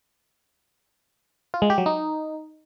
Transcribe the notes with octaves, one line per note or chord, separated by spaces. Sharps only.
F4
G#3
G4
F#3
D#4